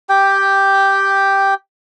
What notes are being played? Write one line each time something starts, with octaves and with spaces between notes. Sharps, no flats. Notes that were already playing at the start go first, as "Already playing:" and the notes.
G4 G5